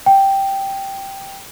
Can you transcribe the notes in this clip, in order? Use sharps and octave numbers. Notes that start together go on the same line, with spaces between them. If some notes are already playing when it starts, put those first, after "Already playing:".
G5